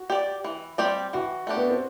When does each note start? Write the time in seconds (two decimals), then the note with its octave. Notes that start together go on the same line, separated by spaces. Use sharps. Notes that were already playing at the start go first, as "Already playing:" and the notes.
Already playing: F#4
0.10 G4 D5
0.44 E3
0.78 G3 C4 G4 D5
1.13 E3 F#4
1.47 A3 D4 G4
1.57 B3
1.69 C4